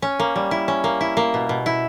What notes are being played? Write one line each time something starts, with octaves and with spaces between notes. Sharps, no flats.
C#4
A#3
G3
E4
C#4
A#3
E4
A#3
B2
B2
E4